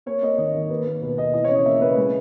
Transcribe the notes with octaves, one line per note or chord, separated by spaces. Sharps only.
A#3 C#5
A#3 D#5
D#3 D#5
D#3
A#3 B4
A#3
B2 B4
B2 D#5
E3 D#5
C#5
C#3 D#5
A#3 E5
C#3 B4
G#3